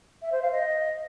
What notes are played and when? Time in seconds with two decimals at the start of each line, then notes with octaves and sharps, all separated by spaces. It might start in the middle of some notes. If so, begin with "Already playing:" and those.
0.22 E5
0.32 C5
0.42 F5
0.52 D#5